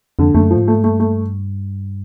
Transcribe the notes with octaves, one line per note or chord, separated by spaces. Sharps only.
F2 D3
F2 A3
F#2
F3
A2
G#2
A3
G2 A3
A3